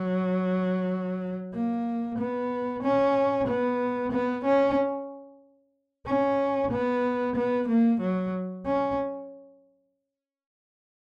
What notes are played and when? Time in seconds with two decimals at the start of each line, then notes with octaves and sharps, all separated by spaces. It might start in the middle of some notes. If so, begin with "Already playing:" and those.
Already playing: F#3
1.54 A#3
2.18 B3
2.83 C#4
3.48 B3
4.12 B3
4.45 C#4
6.07 C#4
6.71 B3
7.36 B3
7.68 A#3
8.01 F#3
8.66 C#4